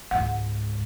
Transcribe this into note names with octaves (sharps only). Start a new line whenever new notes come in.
C#2 G#2 F#5